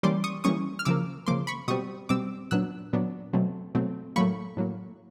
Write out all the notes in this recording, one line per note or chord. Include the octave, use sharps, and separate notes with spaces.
E3 G3 A#3 C#4 C6 D6
C#6 D#6
E3 G3 A#3 C#4 C#6 D#6
F6
C#3 F3 A#3 D6 E6
C#3 F3 A#3 C6 D6
B5 C#6
B2 G3 C4 C#6 D#6
B2 G3 C4 D6 E6
A#2 F#3 B3 D4 E6 F#6
A#2 F#3 B3 D4
B2 F#3 A3 C4
B2 F#3 A3 C4
A2 F#3 A#3 B5 C#6
A2 F#3 A#3